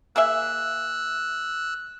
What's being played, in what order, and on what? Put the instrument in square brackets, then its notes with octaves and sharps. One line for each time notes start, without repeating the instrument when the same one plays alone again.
[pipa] A#3 G#4 E5 [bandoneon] E6 F#6